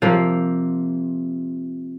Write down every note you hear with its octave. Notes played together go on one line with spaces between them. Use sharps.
C3 F3 A#3